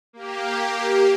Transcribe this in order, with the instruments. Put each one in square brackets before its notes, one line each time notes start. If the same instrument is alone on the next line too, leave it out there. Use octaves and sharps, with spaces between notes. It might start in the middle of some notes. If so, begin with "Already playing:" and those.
[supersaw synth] A#3 G4